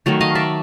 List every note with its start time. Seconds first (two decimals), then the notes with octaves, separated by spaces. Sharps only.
0.06 D#3 F#3 A3
0.21 D#5 F5
0.35 D5 E5